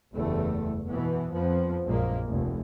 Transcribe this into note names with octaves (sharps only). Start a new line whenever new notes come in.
F#1 E2 G3 A3
B2 E3 B3
F2 F3 B3
A#1 F#2 A#2 G#3 A#3
F1 D2